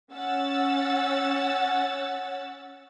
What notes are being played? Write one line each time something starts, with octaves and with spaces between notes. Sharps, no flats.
C#4 F#5 E6 A6